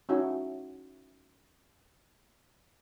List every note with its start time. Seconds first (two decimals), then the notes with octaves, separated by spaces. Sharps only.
0.09 C#4 D#4 E4 F#4 E5 G#5